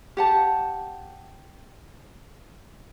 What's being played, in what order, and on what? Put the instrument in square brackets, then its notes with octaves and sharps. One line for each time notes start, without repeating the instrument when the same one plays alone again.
[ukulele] G4 F#5 A5